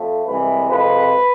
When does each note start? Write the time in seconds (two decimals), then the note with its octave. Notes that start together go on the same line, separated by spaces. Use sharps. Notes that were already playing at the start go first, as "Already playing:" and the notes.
Already playing: F2 A3
0.27 C2 C3 E3 G#3 B4
0.69 F2 C3 G#3 B4